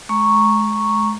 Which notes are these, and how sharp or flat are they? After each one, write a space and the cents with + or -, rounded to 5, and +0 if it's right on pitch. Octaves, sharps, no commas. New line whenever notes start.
G#3 +35 A#5 +0 C#6 -5